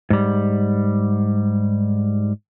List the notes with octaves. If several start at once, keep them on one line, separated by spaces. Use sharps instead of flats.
G#2 G3